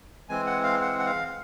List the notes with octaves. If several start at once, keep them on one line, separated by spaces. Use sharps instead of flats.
E3 G#3 C4 G#5
F#5
F5
F#5
F#5
F5